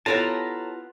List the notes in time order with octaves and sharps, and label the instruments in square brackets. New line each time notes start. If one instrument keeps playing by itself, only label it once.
[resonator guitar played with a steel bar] B3 E4 F4 [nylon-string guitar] G4 A4 C#5 [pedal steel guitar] A5 A#5